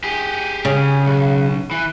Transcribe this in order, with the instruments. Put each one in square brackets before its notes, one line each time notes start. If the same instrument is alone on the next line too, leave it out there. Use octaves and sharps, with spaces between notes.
[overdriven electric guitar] G4 G#4
[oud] C#3
[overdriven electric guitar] B1
E3